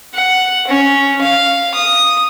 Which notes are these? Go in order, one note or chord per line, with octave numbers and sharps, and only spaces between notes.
F#5
C#4
F5
D#6